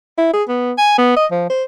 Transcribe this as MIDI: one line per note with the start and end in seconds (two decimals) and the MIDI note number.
0.18 0.29 64
0.33 0.43 68
0.49 0.73 59
0.78 0.95 80
0.98 1.16 59
1.16 1.25 75
1.31 1.49 53
1.49 1.64 72